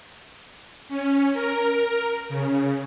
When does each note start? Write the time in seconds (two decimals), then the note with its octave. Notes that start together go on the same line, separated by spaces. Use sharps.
0.89 C#4
1.33 A#4
2.29 C#3